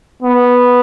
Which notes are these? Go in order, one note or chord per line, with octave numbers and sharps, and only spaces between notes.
B3